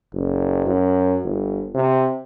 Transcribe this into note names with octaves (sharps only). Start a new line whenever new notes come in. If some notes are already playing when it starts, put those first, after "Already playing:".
F#1
F#2
G1
C3